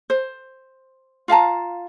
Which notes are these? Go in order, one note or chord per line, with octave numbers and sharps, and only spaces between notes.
C5
F4 F5 A5 A#5